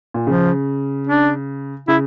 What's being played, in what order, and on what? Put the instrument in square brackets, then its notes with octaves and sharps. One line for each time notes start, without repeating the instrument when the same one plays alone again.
[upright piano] A#2
[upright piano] C#3 [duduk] F3
[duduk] D4
[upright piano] C#3 [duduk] E4